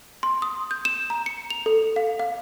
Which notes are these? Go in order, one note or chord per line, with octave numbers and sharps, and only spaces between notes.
C6
D#6
G6
E7
A#5
C#7
F7
A4
F5
F5